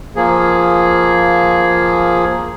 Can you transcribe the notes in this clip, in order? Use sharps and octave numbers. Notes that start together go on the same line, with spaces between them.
F3 A#3 G#4